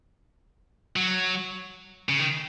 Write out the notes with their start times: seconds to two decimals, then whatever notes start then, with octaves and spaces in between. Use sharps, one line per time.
0.96 F#3
2.09 C#3
2.19 D#3